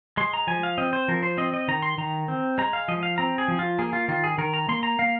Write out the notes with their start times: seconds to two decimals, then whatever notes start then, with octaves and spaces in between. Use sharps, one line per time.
0.17 G#3 C6
0.33 A#5
0.47 F3 G#5
0.63 F5
0.78 C4 D#5
0.93 C5
1.08 F3 A#4
1.23 C5
1.37 C4 D#5
1.54 D#5
1.68 D#3 A#5
1.82 C6
1.98 D#3 A#5
2.28 C4
2.58 G#3 A#5
2.73 F5
2.88 F3 D#5
3.03 F5
3.18 C4 A#5
3.38 G#4
3.48 F3
3.59 F4
3.78 A#3 G#4
3.93 F4
4.08 D#3 F4
4.24 G#4
4.38 D#3 A#4
4.54 A#5
4.69 A#3 C6
4.83 A#5
4.99 A#3 F5